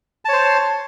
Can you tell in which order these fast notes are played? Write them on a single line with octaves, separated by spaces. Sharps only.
A5 C#5 C5